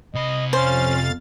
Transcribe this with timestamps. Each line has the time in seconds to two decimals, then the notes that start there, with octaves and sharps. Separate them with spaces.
0.15 C3 D#5 B5
0.53 F2 C#4 C5 F5 A6